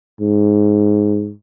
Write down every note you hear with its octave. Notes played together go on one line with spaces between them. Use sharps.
G#2